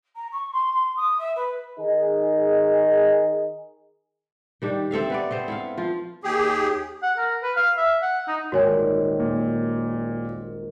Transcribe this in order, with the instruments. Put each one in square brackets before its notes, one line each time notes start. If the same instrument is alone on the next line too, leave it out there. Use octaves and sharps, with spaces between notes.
[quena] A#5
C#6
C6
C6
D#6
E5
B4
[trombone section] D#3 D#4 G#4
[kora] D#3 G3 D4
C4 A4 E5 F5
B3 B4 D5
B3 C4 C5
E4 A4 F5
F3 F4
[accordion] D#2 G4 G#4
[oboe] F#5
A#4
B4
F5
E5
F#5
D#4
[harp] D#1 G#1 A#3 [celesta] F#4 C#5 G#5
[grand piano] A#2